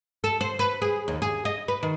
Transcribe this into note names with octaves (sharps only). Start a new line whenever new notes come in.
A4
C5
B4
G#4
D#2
G#4
D#5
B4
D#3